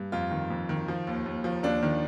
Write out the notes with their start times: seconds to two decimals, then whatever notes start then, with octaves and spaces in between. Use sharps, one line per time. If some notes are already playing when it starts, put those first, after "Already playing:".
Already playing: G2
0.12 F2 F4
0.31 D#3
0.50 F2
0.69 D#3
0.88 F3
1.07 D#2
1.26 D#2
1.44 F3
1.63 D#2 D4
1.83 D#3